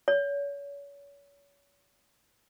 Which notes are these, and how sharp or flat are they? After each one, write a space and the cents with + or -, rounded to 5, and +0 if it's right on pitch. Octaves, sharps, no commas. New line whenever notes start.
C#5 +35